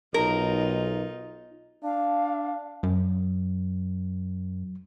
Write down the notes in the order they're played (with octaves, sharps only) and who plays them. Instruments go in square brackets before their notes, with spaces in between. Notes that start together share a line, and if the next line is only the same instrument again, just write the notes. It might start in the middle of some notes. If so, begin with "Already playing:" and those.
[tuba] B1 [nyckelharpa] D#4 F4 [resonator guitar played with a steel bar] A#4
[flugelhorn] D4 [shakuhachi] F5
[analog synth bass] F#2 [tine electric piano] F#3